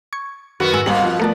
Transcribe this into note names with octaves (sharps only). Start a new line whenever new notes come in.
C#6 G#6
F#2 D#3 B3 F#4 B4
G#2 G#5 E6
G#1 B2 G3 A#3 C4 F#7
F3
F3 A3 B3 A#4 D5 A5